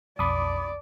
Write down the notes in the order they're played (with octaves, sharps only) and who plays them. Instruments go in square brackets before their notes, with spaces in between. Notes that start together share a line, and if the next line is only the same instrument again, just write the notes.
[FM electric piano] B1 F2 A5 [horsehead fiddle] D5 [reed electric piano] B5 D6 D#6